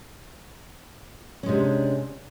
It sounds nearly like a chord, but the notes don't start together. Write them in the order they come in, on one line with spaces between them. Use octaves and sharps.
C#4 G#3 C3 D4